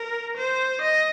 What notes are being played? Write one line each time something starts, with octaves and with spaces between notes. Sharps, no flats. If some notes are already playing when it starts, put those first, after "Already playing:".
Already playing: A#4
C5
D#5